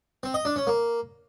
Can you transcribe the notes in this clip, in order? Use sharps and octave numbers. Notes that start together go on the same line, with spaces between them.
C4
D#5
D4
C#4
A#3